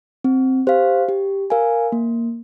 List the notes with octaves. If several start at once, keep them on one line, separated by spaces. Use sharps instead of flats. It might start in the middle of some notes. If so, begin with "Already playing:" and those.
C4
G4 C5 F5
G4
A#4 F5 G#5
A#3